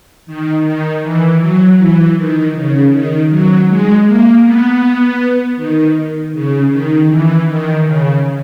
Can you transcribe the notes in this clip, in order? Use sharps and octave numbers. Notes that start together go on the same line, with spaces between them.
D#3
D#3
E3
F#3
E3
D#3
C#3
D#3
F#3
G#3
A#3
B3
D#3
C#3
D#3
E3
D#3
C#3